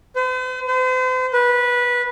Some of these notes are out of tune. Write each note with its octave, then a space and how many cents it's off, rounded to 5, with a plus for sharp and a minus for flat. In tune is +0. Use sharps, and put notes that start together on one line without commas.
C5 -45
C5 -40
B4 -15